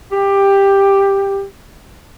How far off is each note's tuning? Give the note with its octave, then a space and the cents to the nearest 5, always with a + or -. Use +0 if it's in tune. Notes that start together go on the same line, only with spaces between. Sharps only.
G4 +10